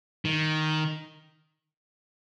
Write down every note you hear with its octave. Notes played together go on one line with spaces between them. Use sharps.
D#3